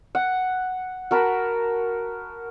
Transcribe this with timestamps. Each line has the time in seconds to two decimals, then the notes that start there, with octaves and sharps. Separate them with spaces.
0.15 F#5
1.11 F#4 A#4 A5 B5